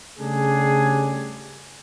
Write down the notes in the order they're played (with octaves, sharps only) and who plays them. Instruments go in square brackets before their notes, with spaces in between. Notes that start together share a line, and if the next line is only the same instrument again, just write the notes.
[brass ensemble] C#3 G3 A3 D4 G#4